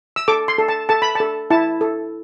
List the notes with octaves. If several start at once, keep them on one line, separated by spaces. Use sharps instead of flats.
E6
A4 D6
C6
A4
A5
A4 A5
B5
A4 A5
E4 A5
A4